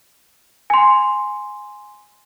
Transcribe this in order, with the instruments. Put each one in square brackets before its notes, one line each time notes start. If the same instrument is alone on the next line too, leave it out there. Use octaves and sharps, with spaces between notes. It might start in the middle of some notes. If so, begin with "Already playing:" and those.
[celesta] G#5 C6